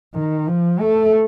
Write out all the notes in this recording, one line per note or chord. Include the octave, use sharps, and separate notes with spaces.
D#3
F3
A3